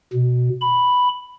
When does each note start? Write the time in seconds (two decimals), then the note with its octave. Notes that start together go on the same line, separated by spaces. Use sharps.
0.13 B2
0.61 B5